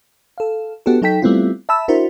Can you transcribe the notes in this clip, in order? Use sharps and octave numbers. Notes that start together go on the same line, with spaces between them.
A4 F5
B3 D4 F#4 G4 A4
F#3 D#4 A4 G5 B6
G3 A3 B3 C4 E4 F4
E5 A5 B5 E6
D4 E4 F#4 A#4 C5